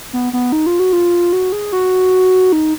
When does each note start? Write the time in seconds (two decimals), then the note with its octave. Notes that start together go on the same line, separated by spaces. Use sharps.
0.13 B3
0.33 B3
0.52 D#4
0.66 F4
0.79 F#4
0.93 F4
1.33 F#4
1.52 G#4
1.72 F#4
2.52 D#4